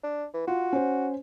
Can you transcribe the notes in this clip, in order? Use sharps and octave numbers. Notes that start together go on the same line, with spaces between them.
D4
E3
F4 F#4
C#4 C5